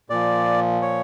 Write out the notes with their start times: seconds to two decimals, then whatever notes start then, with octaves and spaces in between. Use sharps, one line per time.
0.10 A#2 F3 D5
0.82 C#5